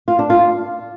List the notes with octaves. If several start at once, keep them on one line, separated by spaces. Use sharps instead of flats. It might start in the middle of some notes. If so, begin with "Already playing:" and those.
F4
D4
F4